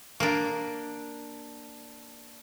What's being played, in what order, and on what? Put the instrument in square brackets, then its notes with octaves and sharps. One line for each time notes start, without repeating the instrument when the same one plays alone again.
[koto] A#3 D4